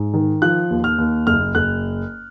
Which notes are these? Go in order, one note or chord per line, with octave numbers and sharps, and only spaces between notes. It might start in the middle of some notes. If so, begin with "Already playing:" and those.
Already playing: G#2
D#3
F3 F#6
D#2
F6
D#2
F#1 F6
F#1 F#6